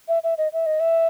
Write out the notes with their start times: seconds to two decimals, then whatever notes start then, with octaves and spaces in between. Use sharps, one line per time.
0.08 E5
0.24 E5
0.38 D#5
0.53 E5
0.66 D#5
0.80 E5